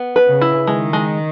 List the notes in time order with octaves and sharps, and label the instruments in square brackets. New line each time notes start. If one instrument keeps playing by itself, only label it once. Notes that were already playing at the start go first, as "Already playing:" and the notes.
Already playing: [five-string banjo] B3
B4
[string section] C#3
[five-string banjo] E4
[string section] D#3 [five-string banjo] G#3
[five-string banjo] G#3